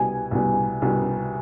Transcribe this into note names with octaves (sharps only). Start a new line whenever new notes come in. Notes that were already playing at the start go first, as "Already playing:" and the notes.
Already playing: C2 B2 G3 B3 G#5
C2 B2 G3 B3
C2 B2 G3 B3